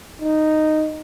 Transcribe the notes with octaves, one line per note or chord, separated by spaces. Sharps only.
D#4